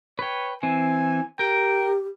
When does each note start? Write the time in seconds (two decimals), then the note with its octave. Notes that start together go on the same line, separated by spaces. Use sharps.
0.19 B4 C#5 G5
0.63 E3 C4 G#5
1.39 G4 A#4 G5